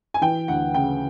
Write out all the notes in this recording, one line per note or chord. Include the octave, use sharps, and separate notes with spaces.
G#5
E3 G5
D2 F#5
C#3 G5